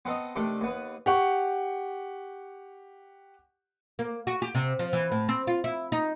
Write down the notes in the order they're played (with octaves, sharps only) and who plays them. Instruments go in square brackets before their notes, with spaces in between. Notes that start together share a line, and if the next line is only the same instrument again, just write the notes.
[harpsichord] B3 C4 A4 D#5 A#5
C3 D#3 A3 D4 A4
D#2 B3 B4
[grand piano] G4 F#5 C#6
[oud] A#3
F#4
G4
C3
F3
E3
A2
C4
F4
E4
D#4